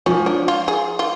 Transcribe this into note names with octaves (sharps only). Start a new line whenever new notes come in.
F3 C#4
D4
F4
G#4
F4